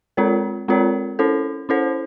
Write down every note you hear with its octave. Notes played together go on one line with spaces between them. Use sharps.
G#3 C4 F4 A#4 C#5
G#3 C4 F4 A#4 C#5
C#4 E4 A4 C5
C#4 E4 A4 C5